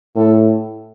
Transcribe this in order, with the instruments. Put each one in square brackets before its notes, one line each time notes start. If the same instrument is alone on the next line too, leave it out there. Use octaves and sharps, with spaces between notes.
[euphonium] A2 [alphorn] A4